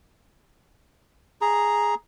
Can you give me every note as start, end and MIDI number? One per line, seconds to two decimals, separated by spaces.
1.41 1.95 68
1.41 1.95 82